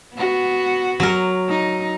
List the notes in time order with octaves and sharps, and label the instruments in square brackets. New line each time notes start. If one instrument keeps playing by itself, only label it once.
[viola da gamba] B3 F#4
[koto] F#3 A#4
[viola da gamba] D#4